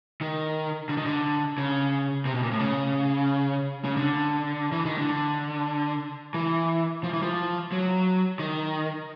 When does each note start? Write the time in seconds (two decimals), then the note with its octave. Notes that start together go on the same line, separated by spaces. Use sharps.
0.21 D#3
0.89 D3
0.97 D#3
1.06 D3
1.58 C#3
2.25 C3
2.34 B2
2.43 A#2
2.51 A2
2.60 C#3
3.85 C#3
3.97 D3
4.72 E3
4.85 D#3
4.98 D3
6.34 E3
7.04 F3
7.13 E3
7.23 F3
7.72 F#3
8.39 D#3